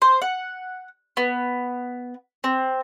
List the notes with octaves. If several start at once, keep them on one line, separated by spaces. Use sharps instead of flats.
C5
F#5
B3
C4